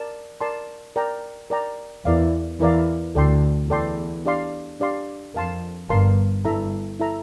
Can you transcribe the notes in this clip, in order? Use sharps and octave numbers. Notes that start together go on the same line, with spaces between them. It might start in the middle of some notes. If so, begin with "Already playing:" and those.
Already playing: A#4 D5 A5
A#4 D5 A5 C6
A#4 D5 G5 A#5
A#4 D5 G5 A#5
E2 E3 E4 A#4 D5 F5
E2 E3 E4 A#4 D5 F5
D2 D3 A4 D5 G5 C6
E2 A4 D5 G5 C6
D4 G4 D5 F5 C6
D4 G4 D5 F5 C6
F2 A#4 F5 A5 C6
G1 G2 A#4 F5 A5 C6
G1 G2 E4 A4 E5 A#5
E4 A4 E5 A#5